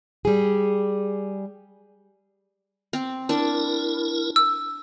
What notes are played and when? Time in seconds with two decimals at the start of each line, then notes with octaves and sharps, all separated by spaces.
0.25 G3 G#4
2.93 C4
3.29 D4 E4 A#4
4.36 E6